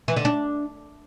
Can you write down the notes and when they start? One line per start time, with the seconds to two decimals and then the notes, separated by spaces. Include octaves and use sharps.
0.08 E3
0.16 D3
0.25 D4